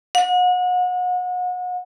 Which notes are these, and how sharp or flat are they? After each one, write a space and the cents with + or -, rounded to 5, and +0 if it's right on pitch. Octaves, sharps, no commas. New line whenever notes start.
F#5 -35